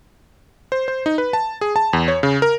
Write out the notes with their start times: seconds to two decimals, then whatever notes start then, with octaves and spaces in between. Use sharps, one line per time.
0.72 C5
0.88 C5
1.06 D#4
1.18 B4
1.33 A5
1.61 G#4
1.76 A5
1.93 E2
2.08 C#5
2.23 C#3
2.42 A#4